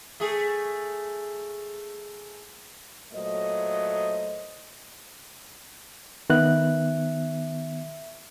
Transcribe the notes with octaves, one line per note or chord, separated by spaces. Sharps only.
A3 G#4
A#2 F#3 A3 C5 D#5
D#3 B3 E5 F#6